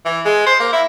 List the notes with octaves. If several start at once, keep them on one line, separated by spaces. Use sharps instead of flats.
E3
G#3
C5
A#3
E4